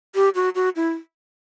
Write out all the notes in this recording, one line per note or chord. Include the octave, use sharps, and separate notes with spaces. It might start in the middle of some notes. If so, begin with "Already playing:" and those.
G4
F#4
F#4
E4